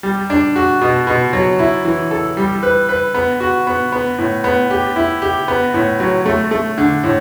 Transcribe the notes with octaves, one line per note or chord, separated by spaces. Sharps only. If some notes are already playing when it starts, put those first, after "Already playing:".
G3
D4
F#4
B2
B2
F#3
E4
E3
A4
G3
B4
B4
B3
F#4
B3
B3
A2
B3
G4
E4
G4
B3
A2
F#3
A3
A3
D3
A2